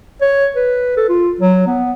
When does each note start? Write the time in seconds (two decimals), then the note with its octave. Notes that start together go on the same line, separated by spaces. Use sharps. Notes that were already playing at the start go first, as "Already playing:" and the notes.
0.21 C#5
0.56 B4
0.97 A4
1.09 F4
1.40 F#3
1.67 B3